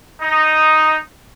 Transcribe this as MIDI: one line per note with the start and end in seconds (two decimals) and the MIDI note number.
0.22 0.96 63